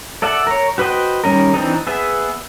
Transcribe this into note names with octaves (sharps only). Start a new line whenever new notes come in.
A4 D5 E5 F#5 A5
A#4 C#5
F#4 B4 C5 D#5 G5
D#3 G3 C#4 A#4
E3 C4 D4 D#4
B3 G#4 E5